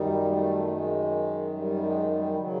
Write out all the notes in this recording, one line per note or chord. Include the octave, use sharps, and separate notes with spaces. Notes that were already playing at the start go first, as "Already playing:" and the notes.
Already playing: F#2 D#3 G3 D#4
A#3
A3
G3
G#3
G3
G#3
G3
C#3 F#3 G#3